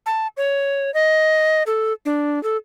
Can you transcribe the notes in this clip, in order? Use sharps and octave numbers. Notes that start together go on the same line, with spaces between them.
A5
C#5
D#5
A4
D4
A4